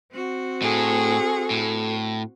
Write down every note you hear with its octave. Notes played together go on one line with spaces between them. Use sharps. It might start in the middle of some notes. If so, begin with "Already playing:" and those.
C4 F#4
A2 G#4 A4
A2